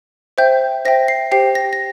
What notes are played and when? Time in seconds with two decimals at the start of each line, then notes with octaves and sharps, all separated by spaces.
0.38 C5 E5 G5 G6
0.85 C5 E5 G5 A#6
1.08 C7
1.32 G4 C5 G5 C7
1.55 A#6
1.73 A#6